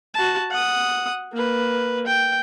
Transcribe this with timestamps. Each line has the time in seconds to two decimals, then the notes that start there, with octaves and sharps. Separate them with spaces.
0.14 F#4 A5
0.51 F#5 D#6
1.33 A#3 B4
2.07 G5